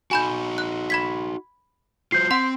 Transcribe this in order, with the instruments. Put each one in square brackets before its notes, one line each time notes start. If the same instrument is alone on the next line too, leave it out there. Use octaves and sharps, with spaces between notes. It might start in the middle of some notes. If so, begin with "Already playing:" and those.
[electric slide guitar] D#4 F#4 [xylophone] G#5 B5 G6
[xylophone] F#6
B5 G#6 B6
[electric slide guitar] F4 F#4 C5 [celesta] G6 C7
[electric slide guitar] C4 [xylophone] F#5 C6